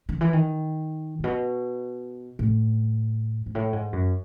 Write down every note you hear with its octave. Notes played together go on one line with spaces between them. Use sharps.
D#3
E3
D#3
A2
B2
A2
G#2
A2
G#2
F#2